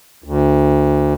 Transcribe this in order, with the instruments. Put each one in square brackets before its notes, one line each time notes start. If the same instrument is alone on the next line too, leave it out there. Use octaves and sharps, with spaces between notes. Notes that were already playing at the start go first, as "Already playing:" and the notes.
[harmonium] D2